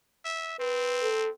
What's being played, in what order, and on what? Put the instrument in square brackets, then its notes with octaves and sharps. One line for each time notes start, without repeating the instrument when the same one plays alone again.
[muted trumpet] E5
[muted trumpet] C4 [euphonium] B4
[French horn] A4